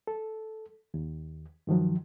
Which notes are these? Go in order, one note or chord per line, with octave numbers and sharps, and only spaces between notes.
A4
D#2
G2 D#3 F3 F#3